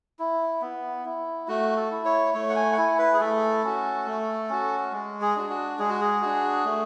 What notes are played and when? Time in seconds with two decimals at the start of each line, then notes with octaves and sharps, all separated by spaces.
0.19 E4
0.61 B3
1.05 E4
1.48 A3 F#4
1.77 A4
1.91 E4
2.05 C#5
2.34 A3 C#5
2.50 F#5
2.56 G#5
2.72 F#5
2.78 E4 G#5
2.99 B4
3.14 G#4
3.20 A3 A4
3.64 C#4 F#4
4.07 A3
4.49 C#4 F#4
4.92 G#3
5.21 G#4
5.36 D4 F#4
5.50 F#4
5.79 G#3 G#4
5.90 F#4
6.00 G#4
6.22 D4 F#4
6.65 A3